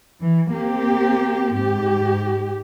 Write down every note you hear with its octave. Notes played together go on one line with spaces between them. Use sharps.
E3
A#3 C4 G4
G#2 G4